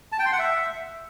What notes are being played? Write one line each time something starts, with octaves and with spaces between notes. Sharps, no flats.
A5
G5
C6
F#5
E5